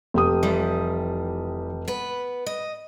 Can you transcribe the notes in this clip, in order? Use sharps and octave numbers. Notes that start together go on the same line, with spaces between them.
F1 G4 D#6
E3 F3 G3
B3 B4
D#5